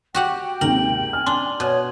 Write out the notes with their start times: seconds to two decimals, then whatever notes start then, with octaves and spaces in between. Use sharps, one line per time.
0.15 F#4 G4 F#5 G5
0.61 D#2 G#2 C3 A#4 F#7
1.13 G#5 F6
1.26 D4 C6
1.60 B2 C#5